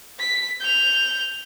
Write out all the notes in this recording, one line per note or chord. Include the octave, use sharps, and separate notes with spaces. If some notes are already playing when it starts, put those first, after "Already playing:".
B6
G6 F7